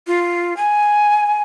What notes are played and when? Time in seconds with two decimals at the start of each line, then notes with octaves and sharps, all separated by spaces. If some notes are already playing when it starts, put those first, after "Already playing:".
0.07 F4
0.57 G#5